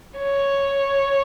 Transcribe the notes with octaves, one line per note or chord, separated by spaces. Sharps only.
C#5